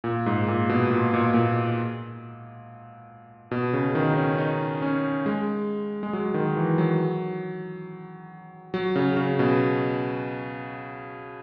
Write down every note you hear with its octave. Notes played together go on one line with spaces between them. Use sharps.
A#2
G#2
A#2
B2
A#2
A#2
A#2
B2
C#3
D#3
D#4
C#4
D#4
C#4
G#3
G#3
F#3
D#3
E3
F#3
F#3
C#3
C#3
B2